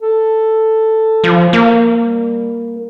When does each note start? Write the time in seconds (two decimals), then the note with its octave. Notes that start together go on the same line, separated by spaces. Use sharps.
0.02 A4
1.24 F3
1.53 A#3
1.97 G3